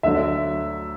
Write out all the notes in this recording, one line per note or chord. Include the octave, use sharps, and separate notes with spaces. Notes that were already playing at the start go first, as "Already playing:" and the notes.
D2 D3 F#3 E5